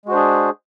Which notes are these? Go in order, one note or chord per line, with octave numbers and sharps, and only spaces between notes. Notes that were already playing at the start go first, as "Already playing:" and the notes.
G#3 D4 F#4 G#4 C5